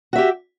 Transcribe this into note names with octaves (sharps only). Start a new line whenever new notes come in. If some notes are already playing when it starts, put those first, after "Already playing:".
F#4 G4 E5